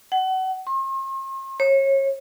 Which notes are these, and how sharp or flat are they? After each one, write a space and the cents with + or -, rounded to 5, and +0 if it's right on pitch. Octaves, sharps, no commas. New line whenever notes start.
F#5 +30
C6 +45
C#5 -30